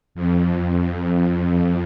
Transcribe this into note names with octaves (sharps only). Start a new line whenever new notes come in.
F2